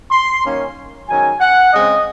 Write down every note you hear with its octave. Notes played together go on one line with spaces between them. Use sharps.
C6
F#2 D#3 A#3 C#4
G#2 D#3 F#3 C#4 G#5
F#5
C#3 G#3 C4 D#5